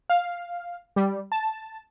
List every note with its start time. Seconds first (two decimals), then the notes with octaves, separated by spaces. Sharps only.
0.09 F5
0.96 G3
1.32 A5